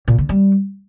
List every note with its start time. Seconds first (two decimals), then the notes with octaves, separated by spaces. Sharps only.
0.08 A#2
0.18 D3
0.29 G3